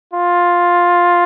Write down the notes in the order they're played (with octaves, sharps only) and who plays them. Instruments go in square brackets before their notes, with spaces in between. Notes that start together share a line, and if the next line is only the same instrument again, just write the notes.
[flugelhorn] F4